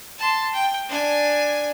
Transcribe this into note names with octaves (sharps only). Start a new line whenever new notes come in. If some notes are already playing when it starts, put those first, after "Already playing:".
A5 C6
G5
D4 G#5